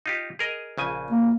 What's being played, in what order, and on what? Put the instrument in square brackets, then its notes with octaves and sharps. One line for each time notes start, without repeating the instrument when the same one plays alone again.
[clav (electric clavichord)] D#4 F4 G4
G#4 A#4 D#5
A#1 C#3 G#5
[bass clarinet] A#3